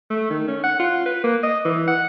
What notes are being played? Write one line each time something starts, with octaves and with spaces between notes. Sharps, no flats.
A3
D#3
C#4
F#5
F4
B4
A#3
D#5
E3
F#5